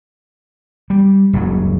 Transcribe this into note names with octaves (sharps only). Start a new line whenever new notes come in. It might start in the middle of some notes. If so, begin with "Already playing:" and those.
G3
F#1 C#2 G#2 F#3